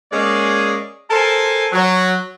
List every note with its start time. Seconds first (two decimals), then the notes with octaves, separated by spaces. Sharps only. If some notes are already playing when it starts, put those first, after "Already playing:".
0.13 G#3 A#3 C#4 G#4 D5 D#5
1.11 A4 A#4 C5 G#5 A5
1.73 F#3